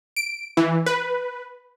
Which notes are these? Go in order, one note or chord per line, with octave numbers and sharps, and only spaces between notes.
D7
E3
B4